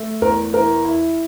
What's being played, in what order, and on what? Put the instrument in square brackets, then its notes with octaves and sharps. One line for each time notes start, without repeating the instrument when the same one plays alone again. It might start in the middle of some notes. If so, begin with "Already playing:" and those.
Already playing: [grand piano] A3
[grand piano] E2 [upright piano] A#4
[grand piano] E3 [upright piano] A#4
[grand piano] E4